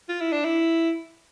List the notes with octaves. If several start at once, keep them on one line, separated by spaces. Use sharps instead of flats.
F4
E4
D4
E4